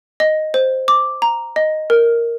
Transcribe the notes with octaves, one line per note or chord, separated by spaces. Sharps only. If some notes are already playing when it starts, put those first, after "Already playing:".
D#5
C5
D6
A#5
D#5
A#4